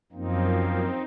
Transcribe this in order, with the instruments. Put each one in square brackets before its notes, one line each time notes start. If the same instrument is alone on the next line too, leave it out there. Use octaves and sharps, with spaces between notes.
[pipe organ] F#2 F3 A#3 C4 D#4